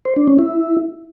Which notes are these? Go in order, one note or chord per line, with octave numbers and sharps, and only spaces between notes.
C5
D4
C#4
E4